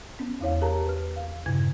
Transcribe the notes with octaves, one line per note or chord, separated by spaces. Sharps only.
B3 C#4
E2 E4 C#5 F5
G4 G#4 A#4 C#5 A5 A#5
B4 F6
F5
G2 A#2 C#3 E4 G#6